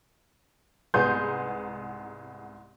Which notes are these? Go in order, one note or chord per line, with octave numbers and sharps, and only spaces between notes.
C2 G#2 B3 G#4 C6 G6